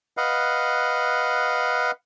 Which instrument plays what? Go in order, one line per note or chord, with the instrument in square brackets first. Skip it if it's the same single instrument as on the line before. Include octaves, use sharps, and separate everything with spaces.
[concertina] B4 D#5 F5 F#5